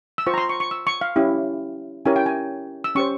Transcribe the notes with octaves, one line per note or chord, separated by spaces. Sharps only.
E6
F4 C5 C#6
A#5
C6
C#6
C#6
E6
C#6
F5
C#4 E4 G4
C#4 E4 G4 A#4 C#5 G#5
G5
G#5
E6
C#4 G4 C5 C#6